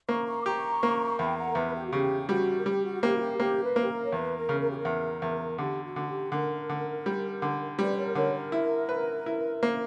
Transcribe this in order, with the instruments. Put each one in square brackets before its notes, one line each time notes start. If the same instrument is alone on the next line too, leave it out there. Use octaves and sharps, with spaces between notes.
[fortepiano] A#3 [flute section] A#5 C#6
[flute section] A#5 C#6
D6
[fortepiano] G4 [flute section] A#5 C#6
[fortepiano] A#3
[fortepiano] E2 [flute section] G5 B5
[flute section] F#5 A#5
A#4
[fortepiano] E2 [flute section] B4
[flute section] G4
F#4
[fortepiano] C#3 [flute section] G4
[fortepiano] G3 [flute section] F#4
[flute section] A#4
[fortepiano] G3 [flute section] G4
[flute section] F#4
[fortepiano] A#3 [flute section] G4
[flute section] F#4
G4
[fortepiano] A#3 [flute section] G4
[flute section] B4
[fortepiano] A#3 [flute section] G4
[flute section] A#4
C#5
[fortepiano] E2 [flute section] B4
[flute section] A#4
[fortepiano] C#3
[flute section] A#4
G4
A#4
[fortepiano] E2
E2
[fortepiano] D3 [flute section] G4
[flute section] F#4
[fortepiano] D3
[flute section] G4
[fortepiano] D3 [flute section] A#4
[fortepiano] D3
G3
D3
[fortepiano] G3 [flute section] B4 D5
[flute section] A#4 C#5
[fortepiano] D3 [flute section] A#4 C#5
[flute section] A#4
[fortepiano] E4
B4
E4
A#3